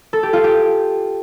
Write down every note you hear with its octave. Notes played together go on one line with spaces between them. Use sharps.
A4
G4
F4
G4